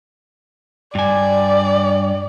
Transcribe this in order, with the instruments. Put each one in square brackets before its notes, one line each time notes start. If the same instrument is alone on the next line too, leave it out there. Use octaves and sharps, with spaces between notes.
[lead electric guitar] G2 G#5 [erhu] D5